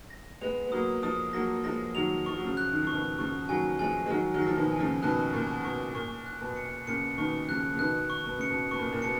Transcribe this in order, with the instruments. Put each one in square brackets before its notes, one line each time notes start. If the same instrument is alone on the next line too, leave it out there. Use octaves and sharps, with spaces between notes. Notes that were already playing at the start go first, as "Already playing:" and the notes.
[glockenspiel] A#6
[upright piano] G#3 B3 [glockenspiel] F7
[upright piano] B3
[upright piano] F#3 A#3 [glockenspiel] D#6
[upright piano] F3 G#3 [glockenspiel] D#6
[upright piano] F#3 A#3 [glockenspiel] A#6
[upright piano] F3 G#3 [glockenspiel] A#6
[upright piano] D#3 F#3 [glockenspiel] F7
[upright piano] F3 [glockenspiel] C#6
[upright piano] F#3
C#3 F3
[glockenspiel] F#6
[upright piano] D#3
[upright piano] F3 [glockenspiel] C#6
[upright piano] B2 D#3
[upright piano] C#3 F3 [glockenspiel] C#6
[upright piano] D#3 F#3 [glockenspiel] G#5
[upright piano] F3 G#3 [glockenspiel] G#5
[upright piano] G#3
[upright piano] D#3 F#3 [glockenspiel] G#5
[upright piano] D#3 F#3
[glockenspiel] A#6
[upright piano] F3
B2 D#3
[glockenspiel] G#5
[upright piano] C#3 F3
[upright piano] B2 D#3 [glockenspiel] F#6
[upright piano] A#2 [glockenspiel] C#6
[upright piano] B2 [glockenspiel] C#6
[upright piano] A#2 [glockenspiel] C#6
[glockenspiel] F#6
[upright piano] B2
[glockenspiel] C#7
[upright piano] A#2 C#3 [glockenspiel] C#7
[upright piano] B2 D#3 [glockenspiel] C#6
[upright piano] C#3 F3 [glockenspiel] F#6
[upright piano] C#3
[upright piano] B2 D#3 [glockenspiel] F#6
[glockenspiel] C#6
[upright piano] B2
[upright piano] C#3 [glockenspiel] C#7
[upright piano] B2
[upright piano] B2 [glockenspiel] C#6
[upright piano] A#2
A#2
[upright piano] B2 [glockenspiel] C#7